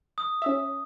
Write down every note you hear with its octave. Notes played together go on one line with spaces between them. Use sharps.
D#6
C#4 E5